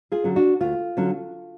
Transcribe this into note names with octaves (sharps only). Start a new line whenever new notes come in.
F4 G#4
D3 F#3 C#4
D4 F#4
D2 F4
D3 F#3 C#4